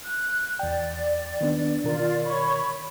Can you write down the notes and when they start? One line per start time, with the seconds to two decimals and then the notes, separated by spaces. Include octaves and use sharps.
0.05 F#6
0.59 E2 D5 G5
1.41 D#3 B3 D4
1.84 B2 D#3 F4 A#4 D5
2.25 C#5 B5 C#6